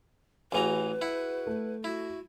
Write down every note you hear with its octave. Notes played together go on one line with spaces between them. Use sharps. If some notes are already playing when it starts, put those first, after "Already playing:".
A1 E3 F#4 G#4 B4 A#5
E4 F#5
A3
E4 F#4